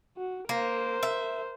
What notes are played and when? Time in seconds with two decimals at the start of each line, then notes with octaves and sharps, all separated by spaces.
0.18 F#4
0.49 A#3 A#4 C5
1.03 E5